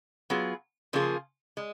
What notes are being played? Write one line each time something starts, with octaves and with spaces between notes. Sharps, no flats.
F#3 B3 F4 G#4
C#3 F3 A#3 F4 G#4
G#3